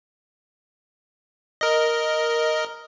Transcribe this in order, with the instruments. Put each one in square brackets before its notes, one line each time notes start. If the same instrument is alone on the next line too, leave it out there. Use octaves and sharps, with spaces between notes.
[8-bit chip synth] A#4 D#5